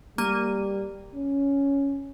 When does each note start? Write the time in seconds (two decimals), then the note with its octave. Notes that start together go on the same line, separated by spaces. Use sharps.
0.18 G3 A#3 D#7
1.15 C#4